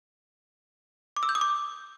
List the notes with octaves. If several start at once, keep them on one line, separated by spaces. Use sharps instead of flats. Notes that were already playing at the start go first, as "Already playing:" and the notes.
D6
E6
G6
D#6
D6